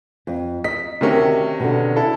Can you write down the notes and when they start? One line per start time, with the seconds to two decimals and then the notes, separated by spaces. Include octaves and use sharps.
0.27 F2
0.64 D#5 B6
1.01 D2 C3 D#3 C#4 A#4
1.60 B2 D3
1.96 E4 A4